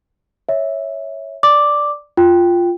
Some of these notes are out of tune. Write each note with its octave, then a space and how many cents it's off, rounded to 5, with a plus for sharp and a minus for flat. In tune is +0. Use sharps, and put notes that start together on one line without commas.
C#5 +0 E5 -10
D5 +0 D6 +0
F4 +0 G5 +0